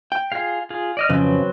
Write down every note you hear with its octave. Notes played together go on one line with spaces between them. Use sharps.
G5
F4 G#4 F5
F4 G#4
D5 D#5 F6
F2 C#3 F#3 C4 B4